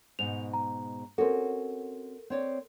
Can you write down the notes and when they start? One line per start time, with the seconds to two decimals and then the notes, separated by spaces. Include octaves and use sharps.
0.19 G#2 B2 D#4 F7
0.53 A#5
1.18 C4 C#4 F#4 A4 A#4
2.30 C4 C#5 D5